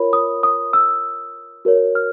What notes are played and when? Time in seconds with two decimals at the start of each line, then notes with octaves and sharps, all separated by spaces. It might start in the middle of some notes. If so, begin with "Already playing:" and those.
Already playing: F4 A#4 C#5 B5
0.13 D#6
0.43 D#6
0.73 E6
1.65 F#4 A#4 C#5
1.95 F6